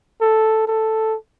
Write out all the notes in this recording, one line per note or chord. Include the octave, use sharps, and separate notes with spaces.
A4
A4